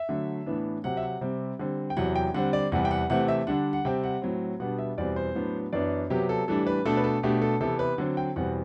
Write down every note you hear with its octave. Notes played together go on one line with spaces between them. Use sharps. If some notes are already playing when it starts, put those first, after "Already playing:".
Already playing: E5
D3 F#3 A3
A2 E3 B3 D4
C3 F#3 C4 F#5
E5
F#5
C3 G3 C4
D3 G3 C4
G5
E2 C3 F#3 F#5
G5
D3 G3 C4 F#5
D5
E2 C3 G3 F#5
G5
F#5
C3 E3 A3 C4 F#5
E5
D3 G3 D4 F#5
F#5
C3 G3 C4 G5
F#5
A2 F#3 C4
B2 G3 B3 D4 F#5
E5
E2 B2 G3 C4 D5
C5
A2 F#3 B3 D4
F#2 E3 B3 D4 D5
C3 F#3 B3 G4
A4
A2 E3 G3 D4 A4
B4
B2 A3 D4 A4
B4
A4
B2 A3 D4 G4
A4
C3 E3 B3 A4
B4
D3 F#3 C4
G5
E2 B2 G3 C4 F#5